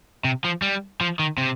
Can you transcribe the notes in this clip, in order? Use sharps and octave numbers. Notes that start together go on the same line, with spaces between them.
C3
F3
G3
F3
D#3
C3